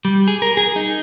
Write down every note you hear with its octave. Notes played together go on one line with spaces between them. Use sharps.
G3
G#4
A#4
G#4
D#4